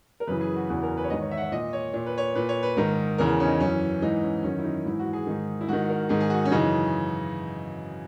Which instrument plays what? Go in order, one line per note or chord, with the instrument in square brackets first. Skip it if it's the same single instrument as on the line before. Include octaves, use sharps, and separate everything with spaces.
[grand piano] A#4
F#2 C#3 E3 B4
G#4
F#4
E2 C#3 E3 F#4
A#4
B4
C#5
G#2 D#3 D#5
C#5
E5
F#5
E5
A#2 D#5
C#5
A#2 C#5
B4
C#5
A#2 B4
C#5
B4
G#2 D#3 A#4
E2 C#3 E3 A#4
C#4
D#4
F#2 E3 C#4
G#2 E3 D#4
C#4
F#2 D#3 C#4
E4
D#4
G#2 E3 E4
F#4
G#4
G#2 D#3
E4
G#2 D#3 F#4
A#4
G#2 D#3 G#4
G#4
F#4
C#4
F#2 C#3 E3 D#4